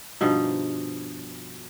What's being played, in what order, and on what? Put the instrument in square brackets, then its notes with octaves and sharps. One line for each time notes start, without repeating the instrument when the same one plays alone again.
[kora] G2 B2 F3 D#4